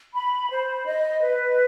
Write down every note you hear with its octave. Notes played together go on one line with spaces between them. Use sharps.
B5
C5
D#5
B4